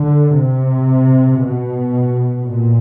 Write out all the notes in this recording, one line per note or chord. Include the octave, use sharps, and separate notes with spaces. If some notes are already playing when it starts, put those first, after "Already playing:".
Already playing: D3
C3
B2
A#2